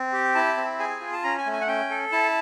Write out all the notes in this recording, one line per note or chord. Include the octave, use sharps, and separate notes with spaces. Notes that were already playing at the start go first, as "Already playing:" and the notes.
Already playing: C4
G4
E4 A5
C4
G#4 G#5
F4
A5
C#4 A#5
G#5
A3
G#5
F#5
C#4 G5
A4
E4 A5